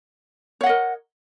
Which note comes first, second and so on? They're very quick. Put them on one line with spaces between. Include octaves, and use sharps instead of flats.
C#5 F#5 D#5 A#4